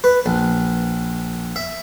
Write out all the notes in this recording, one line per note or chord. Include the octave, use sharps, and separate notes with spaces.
B4
A#1
E5